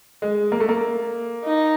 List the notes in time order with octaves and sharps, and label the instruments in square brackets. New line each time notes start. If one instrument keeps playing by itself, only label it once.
[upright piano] G#3
A#3
A3
A#3
[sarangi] D#4